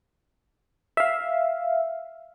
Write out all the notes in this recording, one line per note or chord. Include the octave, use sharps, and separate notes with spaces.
E5 F5